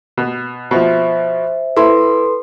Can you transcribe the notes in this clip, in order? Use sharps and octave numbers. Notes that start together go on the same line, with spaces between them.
B2
B2 F3 C5 E5
E4 A4 B4 C6